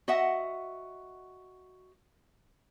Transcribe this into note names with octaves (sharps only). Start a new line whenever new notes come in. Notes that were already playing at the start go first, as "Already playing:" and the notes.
F#4 D#5 E5 F#5